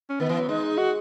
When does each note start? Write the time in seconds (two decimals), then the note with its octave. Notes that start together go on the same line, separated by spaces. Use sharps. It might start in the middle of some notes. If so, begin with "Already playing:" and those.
0.09 C#4
0.20 D#3 B3
0.29 E3
0.39 F#3
0.49 G#3 D#4
0.78 F#4